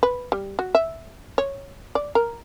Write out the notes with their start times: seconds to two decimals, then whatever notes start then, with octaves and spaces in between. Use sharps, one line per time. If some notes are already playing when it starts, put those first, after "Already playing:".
0.03 B4
0.32 G3
0.59 F#4
0.75 E5
1.38 C#5
1.95 D5
2.15 A#4